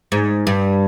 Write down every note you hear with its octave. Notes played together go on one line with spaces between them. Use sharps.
G#2
G2